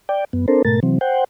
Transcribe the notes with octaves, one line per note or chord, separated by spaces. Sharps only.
D5 G5
F#2 B3
C4 D4 A4 A#4 C5
G#2 B2 A3 A#4 A6
C3 E3 F#3 C4
C5 F#5 G5